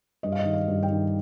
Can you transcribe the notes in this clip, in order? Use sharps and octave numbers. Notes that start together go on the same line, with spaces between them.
G2 D#5
F5
D#5
D#3
F5
G2
G5
D#3